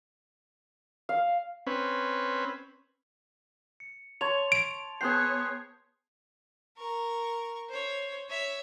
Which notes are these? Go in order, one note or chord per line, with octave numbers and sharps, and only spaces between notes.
F5
C4 C#4 B4
C#7
C#5 A5 C6 C#6 G#6 F7
D7
B3 G#4 C5 C#5 G5 A5 F#6 C7
A#4 C#6
C5 C#5
C#5 E5